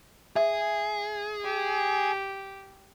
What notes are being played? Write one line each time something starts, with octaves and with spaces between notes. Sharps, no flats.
G#4 E5
G4